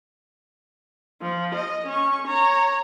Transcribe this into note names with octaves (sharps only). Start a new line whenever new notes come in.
F3
D#5
C#4 C#6
C#5 A#5